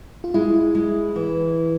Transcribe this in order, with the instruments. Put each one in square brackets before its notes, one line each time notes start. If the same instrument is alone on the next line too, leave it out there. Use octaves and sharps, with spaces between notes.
[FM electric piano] F4
[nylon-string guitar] G#3 [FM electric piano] E4
[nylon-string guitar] G#3
E3